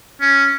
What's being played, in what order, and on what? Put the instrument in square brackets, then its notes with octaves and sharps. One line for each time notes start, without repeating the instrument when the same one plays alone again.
[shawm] C#4